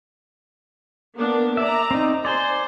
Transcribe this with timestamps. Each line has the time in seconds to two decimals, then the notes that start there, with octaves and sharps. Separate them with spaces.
1.14 A#3 B3 D4
1.57 D5 E5 A#5
1.91 C4 D#4
2.25 C5 D5 G#5